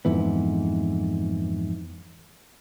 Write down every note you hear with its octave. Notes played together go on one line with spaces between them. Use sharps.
F2 G#2 E3 B3